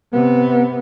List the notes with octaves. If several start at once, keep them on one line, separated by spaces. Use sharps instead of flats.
C3 B3